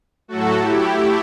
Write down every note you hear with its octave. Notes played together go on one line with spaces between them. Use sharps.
A2 F#3 A3 F#4 A4
E4 G4
A3